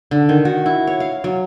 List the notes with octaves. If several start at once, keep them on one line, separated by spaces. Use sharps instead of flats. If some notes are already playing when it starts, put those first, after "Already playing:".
D3
D#3
F#4
E4
C#5
F5
F#3